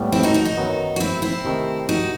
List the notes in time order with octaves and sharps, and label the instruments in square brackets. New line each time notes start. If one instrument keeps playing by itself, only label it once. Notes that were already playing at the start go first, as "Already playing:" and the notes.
Already playing: [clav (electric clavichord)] A2 G3 B3
[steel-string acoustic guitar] C4 E4
D#4 F#4
D#4 F#4
D#4 F#4
[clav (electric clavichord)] F#2 D#3 F#3 B3
[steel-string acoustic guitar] F#4
C4 E4
C4 E4
[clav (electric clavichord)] C3 D#3 A3
[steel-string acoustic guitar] D#4 F#4